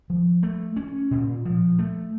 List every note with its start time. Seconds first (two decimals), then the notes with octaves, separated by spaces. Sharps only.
0.10 F3
0.43 A3
0.76 C#4
1.11 A#2
1.45 F3
1.79 A3